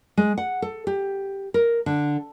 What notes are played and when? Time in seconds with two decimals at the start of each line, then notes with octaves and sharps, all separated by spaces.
0.17 G#3
0.38 F#5
0.62 A4
0.87 G4
1.54 A#4
1.86 D3